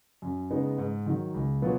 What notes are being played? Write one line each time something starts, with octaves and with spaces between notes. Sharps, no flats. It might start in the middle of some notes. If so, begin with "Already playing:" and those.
F#2
C#3 G#3 B3 D#4
G#2
D#3 F#3
C#2
B2 F#3 B3 F4